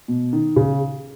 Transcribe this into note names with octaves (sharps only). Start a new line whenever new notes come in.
B2
D#3
C#3